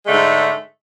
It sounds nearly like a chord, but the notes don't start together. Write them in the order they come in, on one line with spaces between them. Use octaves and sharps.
G#3 A3 D3 G#2